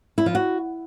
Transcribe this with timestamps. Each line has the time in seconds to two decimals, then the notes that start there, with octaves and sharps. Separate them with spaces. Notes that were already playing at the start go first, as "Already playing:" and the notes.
0.18 E4
0.26 F3
0.35 F#4